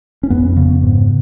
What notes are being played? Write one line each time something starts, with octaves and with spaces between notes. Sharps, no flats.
C#4
F2 B3
C#3
G#2